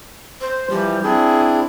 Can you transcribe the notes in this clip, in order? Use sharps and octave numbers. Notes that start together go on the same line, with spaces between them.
C5
E3 F3 G3
C4 D4 E4 G#4